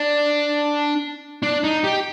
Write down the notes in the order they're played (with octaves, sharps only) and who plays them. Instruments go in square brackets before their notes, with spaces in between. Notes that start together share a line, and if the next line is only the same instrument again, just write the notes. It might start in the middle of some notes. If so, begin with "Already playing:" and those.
Already playing: [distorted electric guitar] D4
D4
D#4
G4